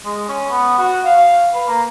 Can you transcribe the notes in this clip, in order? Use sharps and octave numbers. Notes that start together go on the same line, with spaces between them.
G#3
C#4
B3
F#4
F5
B4
A#3